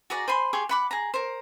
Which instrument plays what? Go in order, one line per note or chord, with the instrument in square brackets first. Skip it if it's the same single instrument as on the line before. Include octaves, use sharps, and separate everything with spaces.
[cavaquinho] F#4 G#4 D5 A#5
C5 G#5 B5 C6
G4 G#4 C6 C#6
F#5 B5 D6
G#4 A#5
A#4 C5